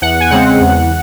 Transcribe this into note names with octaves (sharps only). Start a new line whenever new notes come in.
E2 F#5
G#5
C#3 G#3 C4 F#5
E2